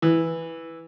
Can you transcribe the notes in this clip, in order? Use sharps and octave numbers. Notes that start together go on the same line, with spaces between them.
E3